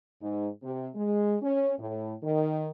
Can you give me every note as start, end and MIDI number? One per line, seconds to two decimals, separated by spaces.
0.22 0.48 44
0.63 0.88 48
0.95 1.35 56
1.42 1.73 61
1.78 2.13 45
2.23 2.70 51